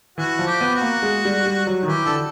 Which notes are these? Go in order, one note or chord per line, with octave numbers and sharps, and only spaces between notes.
E3 F#4
F3
G4
B3
F#4
A#3
G#3
G3
G3
F#3
D#3
E3 G4
D3 A4